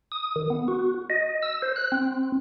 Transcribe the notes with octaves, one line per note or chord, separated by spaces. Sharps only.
D#6
D#3
B3
F#4
D#5
E6
C5
F#6
C4